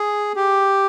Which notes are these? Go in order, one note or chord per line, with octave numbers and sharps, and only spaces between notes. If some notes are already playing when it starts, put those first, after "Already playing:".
Already playing: G#4
G4